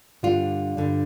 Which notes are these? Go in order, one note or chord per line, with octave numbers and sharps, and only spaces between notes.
G2 D3 G3 F4
G2 D3 G3